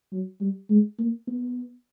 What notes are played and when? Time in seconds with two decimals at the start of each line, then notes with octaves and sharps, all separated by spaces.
0.12 F#3
0.41 G3
0.70 G#3
0.98 A#3
1.27 B3